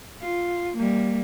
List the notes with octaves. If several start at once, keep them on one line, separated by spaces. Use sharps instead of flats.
F4
G3 A#3